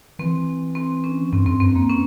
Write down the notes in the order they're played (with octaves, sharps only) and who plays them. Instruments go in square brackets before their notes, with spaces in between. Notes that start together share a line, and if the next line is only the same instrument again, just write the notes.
[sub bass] E3 [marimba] C4
[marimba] C4
C#4
[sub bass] G2 [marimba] C4
[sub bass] F2 [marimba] C4
[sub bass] G2 [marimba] C4
[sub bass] F2 [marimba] A#3
[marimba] C#4